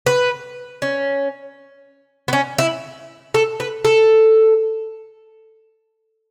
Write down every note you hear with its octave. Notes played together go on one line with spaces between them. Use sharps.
B4
C#4
B3
C#4
E4
A4
B4
A4